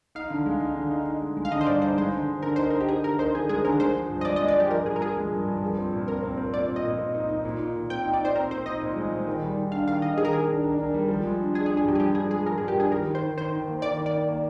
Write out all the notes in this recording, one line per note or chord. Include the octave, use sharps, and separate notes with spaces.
D#4 F5
D3
G#3
D#4
D3
D#4
D#4
G#3
G#3
F5
D3 D#5
C5
G2 D5
D#4 C5
G#3 C5
D3
D3
D3 A#4
D#4 C5
A#4
D#4
G4
D#4 G#4
D3 A#4
D#4 C5
D3 G#4
G#3 G#4
D3 A#4
G#3 C5
F3
G2
D#5
G#3 D5
D#5
G#3
D5
F3 G4
F3 A#4
G2 G#4
A#4
F3 G#4
G#3
G2
G2
F3
C4
A#2
C4 A#4
C4
C4
A#2 D5
C4
D#5
A#2
C4
D#4
D#4
A#2
D#4
A#2
C4 G5
D#4
D5
D#4 C5
C4 A#4
C4 C5
D#4 D#5
A#2
G#3
G#3
D#3
G3
D#3
D4 F5
D#3 F5
D#3 D#5
D#3 G#4
A#4
D#3 G#4
D4
D4
D4
G3
F3
G#3
D4
D4 G#4
G#4
D4
G#4
G2 G4
G#4
F3 G4
D4 G#4
G#3 G#4
F3 A#4
G#4
G2
G4
D4 G#4
D#3 A#4
D#3
C5
D#3
D#3 C5
D#3
A#3
D#3 D5
D#3
D5
D#3
A#3